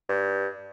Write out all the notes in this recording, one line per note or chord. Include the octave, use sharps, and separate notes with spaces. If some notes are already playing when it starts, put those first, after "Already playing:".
G2